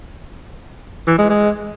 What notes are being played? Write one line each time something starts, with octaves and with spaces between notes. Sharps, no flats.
E3
G#3
G#3